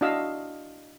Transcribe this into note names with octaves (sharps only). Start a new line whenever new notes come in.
D4 E4 F#4 D#5 F5 E6